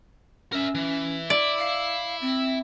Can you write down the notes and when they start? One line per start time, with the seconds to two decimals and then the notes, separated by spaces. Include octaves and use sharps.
0.52 C#4 A#4 E5
0.75 E3
1.30 E4 D5
1.58 F5
2.21 C4